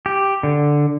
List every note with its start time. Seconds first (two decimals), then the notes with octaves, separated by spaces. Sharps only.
0.06 G4
0.43 D3